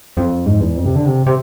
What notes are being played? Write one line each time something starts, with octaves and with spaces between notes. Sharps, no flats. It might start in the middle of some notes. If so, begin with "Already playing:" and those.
F2
G#2
E2
F2
C3
D3
C3
C3